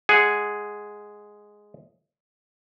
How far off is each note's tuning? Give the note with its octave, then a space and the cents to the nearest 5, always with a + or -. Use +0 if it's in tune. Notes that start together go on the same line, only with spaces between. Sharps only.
G#3 +0 G#4 +0 F#5 +0